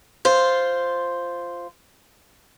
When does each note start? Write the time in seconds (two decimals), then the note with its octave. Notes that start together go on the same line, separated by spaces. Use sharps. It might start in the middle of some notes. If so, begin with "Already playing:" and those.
0.25 F4 C5